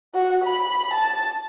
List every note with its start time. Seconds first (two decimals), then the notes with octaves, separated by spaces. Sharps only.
0.14 F#4
0.44 B5
0.93 A5